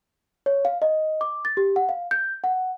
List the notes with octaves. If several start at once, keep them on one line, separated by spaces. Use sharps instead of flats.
C#5
F5
D#5
D6
A6
G4
F#5
F5
G6
F#5